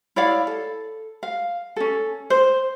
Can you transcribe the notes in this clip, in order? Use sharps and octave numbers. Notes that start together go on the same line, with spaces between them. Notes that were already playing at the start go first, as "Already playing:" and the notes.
E4 C#5 D5 F5
A4
F5
C#4 A4
C5